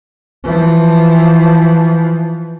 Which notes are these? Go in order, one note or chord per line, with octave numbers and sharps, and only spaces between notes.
E3 F3